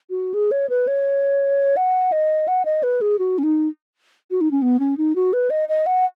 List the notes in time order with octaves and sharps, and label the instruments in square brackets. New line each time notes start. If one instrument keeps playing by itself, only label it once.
[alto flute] F#4
G#4
C#5
B4
C#5
F#5
D#5
F#5
D#5
B4
G#4
F#4
C#4
D#4
F#4
D#4
C#4
B3
C#4
D#4
F#4
B4
D#5
D#5
F#5